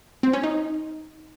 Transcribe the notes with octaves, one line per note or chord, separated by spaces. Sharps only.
C4
C#4
D#4